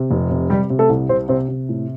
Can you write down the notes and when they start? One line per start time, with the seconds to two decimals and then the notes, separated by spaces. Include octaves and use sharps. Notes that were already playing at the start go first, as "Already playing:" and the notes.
Already playing: C3
0.11 F1
0.31 C3
0.50 C3 G3 G4
0.70 C3
0.79 A3 A4
0.89 C2
1.09 C3 C4 C5
1.29 C3 C4
1.48 C3
1.69 A2